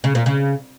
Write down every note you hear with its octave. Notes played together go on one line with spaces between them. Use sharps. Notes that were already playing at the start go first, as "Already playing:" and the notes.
C#3
A#2
C#3